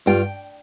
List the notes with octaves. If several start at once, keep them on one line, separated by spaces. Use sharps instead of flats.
G2 G3 F4 G5